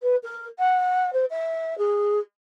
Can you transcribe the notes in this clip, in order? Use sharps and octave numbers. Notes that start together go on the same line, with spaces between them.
B4
A#4
F#5
C5
E5
G#4